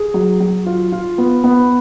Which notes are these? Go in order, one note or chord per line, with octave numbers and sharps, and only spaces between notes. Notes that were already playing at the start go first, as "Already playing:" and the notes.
Already playing: G#4
F#3
F#3
F4
F4
B3
B3